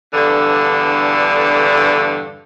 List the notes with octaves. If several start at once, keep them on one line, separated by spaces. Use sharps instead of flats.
E2 G2 D3